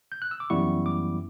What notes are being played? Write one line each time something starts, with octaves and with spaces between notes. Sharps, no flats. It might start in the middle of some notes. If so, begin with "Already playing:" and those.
G6
F#6
E6
D6
F#2 E3 G3 B3 E4 C#6
D6